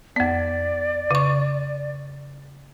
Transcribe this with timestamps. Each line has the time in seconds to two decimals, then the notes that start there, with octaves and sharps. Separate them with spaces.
0.16 F2 B3 D5
1.11 C#3 C#6